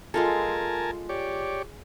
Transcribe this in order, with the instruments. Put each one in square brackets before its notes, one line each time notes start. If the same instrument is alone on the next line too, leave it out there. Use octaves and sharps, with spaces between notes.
[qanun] G#3 F4 A4 [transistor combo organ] A#4 G#5 A5
[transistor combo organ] G4 C#5 D5